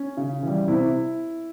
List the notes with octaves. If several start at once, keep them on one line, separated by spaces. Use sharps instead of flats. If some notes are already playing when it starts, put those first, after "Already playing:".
Already playing: C#4
C#3
E3
G3
C3 E4